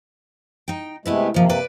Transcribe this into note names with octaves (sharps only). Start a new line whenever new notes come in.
D#4 G5
C3 G#3 A3 B3 E4 B4
C3 D#3 F3 A#3
B4 D5